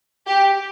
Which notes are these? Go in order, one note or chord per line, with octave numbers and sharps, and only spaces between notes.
G4